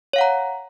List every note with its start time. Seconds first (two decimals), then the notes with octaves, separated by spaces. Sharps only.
0.13 C#5
0.16 F5
0.18 F#5
0.21 A#5